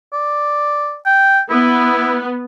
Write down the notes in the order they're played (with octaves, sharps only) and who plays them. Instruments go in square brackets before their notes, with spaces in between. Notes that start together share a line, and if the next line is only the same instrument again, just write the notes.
[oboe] D5
G5
[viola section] B3 [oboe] E4